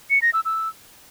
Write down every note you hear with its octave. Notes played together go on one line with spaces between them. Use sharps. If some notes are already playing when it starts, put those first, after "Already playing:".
C#7
A#6
E6
E6